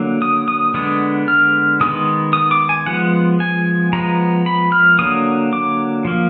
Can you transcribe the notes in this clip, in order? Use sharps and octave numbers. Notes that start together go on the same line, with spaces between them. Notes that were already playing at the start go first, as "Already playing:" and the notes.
Already playing: D3 F#3 A#3
D#6
D#6
D3 G#3 B3 D#6
F6
D#3 G#3 B3 D#6
D#6
D6
G#5
F3 G#3 B3 F#5
G#5
F3 G#3 B3 A#5
B5
F6
D3 F#3 A#3 D#6
D6
F3 A#3